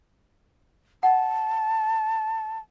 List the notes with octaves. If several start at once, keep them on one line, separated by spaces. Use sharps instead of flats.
F#5 A5